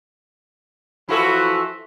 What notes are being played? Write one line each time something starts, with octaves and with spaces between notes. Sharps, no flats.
E3 F3 E4 F#4 A4 E5